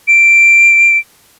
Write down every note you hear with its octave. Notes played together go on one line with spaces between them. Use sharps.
D7